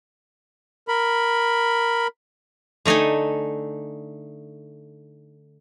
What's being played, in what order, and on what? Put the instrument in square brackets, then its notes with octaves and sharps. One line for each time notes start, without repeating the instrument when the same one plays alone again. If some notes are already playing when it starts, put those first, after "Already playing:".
[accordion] A#4 B5
[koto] D3 A3 D#4 A4 G#5